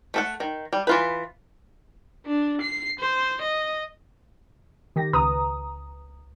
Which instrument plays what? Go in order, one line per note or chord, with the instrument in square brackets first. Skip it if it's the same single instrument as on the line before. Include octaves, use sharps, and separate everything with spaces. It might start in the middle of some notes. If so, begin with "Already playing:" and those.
[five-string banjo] A3 A4 F#5
D#3
G3
E3 F4 B4
[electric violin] D4
C7
C5
D#5
[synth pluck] D#3 G4 A#6
C#2 B4 A#5 D#6